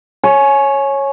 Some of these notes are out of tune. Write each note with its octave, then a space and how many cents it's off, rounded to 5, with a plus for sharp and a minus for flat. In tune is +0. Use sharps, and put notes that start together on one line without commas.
C#5 -10 G#5 +25